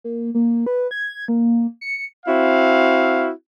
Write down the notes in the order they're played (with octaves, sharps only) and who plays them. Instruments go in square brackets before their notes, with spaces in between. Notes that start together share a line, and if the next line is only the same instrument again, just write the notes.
[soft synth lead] A#3
A#3
B4
G#6
A#3
C#7
[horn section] C4 E4 F#4 F5